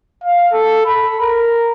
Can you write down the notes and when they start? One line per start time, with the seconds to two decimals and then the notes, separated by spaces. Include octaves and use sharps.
0.24 F5
0.52 A4
0.86 B5
1.20 A#4